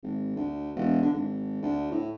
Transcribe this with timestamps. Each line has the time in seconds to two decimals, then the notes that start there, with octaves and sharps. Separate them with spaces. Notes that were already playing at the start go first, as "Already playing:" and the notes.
0.03 G#1
0.36 D2
0.76 E1
1.02 D3
1.14 G#1
1.63 D2
1.91 A2